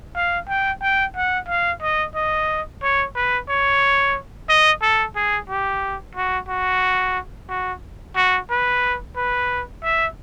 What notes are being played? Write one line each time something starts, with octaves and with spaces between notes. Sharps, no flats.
F5
G5
G5
F#5
F5
D#5
D#5
C#5
B4
C#5
D#5
A4
G#4
G4
F#4
F#4
F#4
F#4
B4
B4
E5